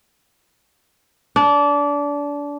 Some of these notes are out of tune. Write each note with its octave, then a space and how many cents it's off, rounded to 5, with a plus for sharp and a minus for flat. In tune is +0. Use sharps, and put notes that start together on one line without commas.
D4 -25